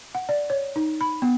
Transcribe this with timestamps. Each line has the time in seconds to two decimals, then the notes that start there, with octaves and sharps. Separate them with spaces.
0.15 F#5
0.29 D5
0.50 C#5
0.76 D#4
1.01 B5
1.22 B3